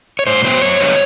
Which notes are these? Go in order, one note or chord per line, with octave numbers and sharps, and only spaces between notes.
C#5
A2 C5
F#3 B3 C5
F#2 C#5
D3 G3 B3